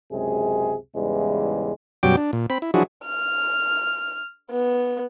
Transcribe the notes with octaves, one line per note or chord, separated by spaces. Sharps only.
C#2 F#2 C3 G#3 G#4
E2 G#2 C#3 E3 G3 G#3
F#2 B2 F#3 G3 G5 D6
D4
A#2
C4 B5
E4
F3 F#3 D4 E4 F#4 G#4
F6
B3